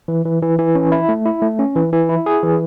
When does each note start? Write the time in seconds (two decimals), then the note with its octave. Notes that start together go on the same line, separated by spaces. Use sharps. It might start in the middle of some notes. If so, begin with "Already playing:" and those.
0.08 E3
0.25 E3
0.42 E3
0.58 E3
0.75 C#4
0.92 E4
1.09 A3
1.25 E4
1.42 A3
1.59 C#4
1.76 E3
1.93 E3
2.09 E4
2.26 G#4
2.43 E3